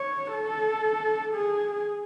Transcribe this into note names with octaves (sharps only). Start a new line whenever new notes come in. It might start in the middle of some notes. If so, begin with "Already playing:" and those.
Already playing: C#5
A4
G#4